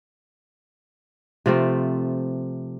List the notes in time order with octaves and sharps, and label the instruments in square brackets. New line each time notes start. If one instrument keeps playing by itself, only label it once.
[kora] C3 F3 A3 C4